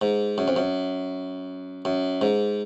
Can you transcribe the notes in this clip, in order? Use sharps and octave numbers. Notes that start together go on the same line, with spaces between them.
G#2
F#2
F2
F#2
F#2
G#2